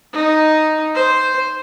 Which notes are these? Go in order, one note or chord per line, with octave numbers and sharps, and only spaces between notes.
D#4
C5